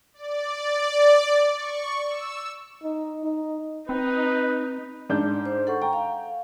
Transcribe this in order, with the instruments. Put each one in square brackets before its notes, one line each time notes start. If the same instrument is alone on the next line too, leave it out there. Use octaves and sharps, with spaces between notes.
[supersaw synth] D5
C#6
E6
[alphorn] D#4
D#4
[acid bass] C4 [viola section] D#4 [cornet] B4
[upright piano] G#2 D4 G6
[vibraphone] C5
A4 F#5 C#6
[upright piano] G5 [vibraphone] A#5
[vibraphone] F5